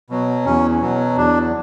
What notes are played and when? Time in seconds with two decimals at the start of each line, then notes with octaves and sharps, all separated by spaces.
0.10 B2 F#3
0.46 E2 C#4
0.81 B2 F#3
1.16 E2 D4